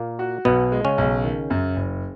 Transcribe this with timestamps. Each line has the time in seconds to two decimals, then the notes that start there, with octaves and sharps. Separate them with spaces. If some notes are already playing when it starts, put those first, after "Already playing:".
Already playing: A#2 A#3
0.19 F#4
0.45 B1 B2 B3
0.72 G#3
0.85 C#3 C#4
0.98 B1
1.24 D#3
1.50 F#2
1.76 F#1